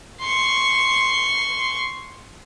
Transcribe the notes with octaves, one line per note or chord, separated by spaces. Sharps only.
C6 C#6